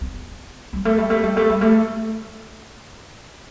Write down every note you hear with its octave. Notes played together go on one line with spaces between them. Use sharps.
B3
G3
A3
G3
A3
G3
A3
G3
A3